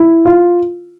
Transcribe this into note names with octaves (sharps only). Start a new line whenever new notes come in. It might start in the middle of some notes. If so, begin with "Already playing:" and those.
Already playing: E4
F4